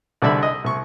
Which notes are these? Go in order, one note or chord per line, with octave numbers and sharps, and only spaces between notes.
C2 D3 G3 D5 E5 B5
D#5
C2 C#6